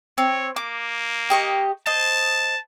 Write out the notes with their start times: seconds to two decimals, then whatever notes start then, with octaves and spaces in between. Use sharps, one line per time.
0.18 C4 C#5
0.56 A#3 D6
1.30 G4 D#5 C#6
1.86 C5 D#5 A5